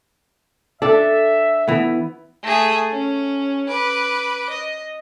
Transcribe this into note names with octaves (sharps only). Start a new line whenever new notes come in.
D4 A4 E5
E3 B3
A3 G#4
C#4
B4 D6
D#5